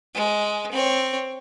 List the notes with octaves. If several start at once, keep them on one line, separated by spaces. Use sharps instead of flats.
G#3
C4 C#5